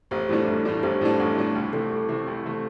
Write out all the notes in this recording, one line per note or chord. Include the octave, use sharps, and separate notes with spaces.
A1 G4 C5
A2 G3 D4 E4 A4
A1
A2 G3 D4
A1 G4 C5
A2 G3 D4 E4 A4
A1
A2 G3 D4 E4
C2
C3 A3 E4 A4
C2
C3 A3 E4
C2
C3 A3